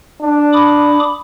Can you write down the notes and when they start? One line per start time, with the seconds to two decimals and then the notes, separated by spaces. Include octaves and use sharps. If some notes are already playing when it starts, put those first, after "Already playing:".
0.21 D4
0.53 B5 D6 D#6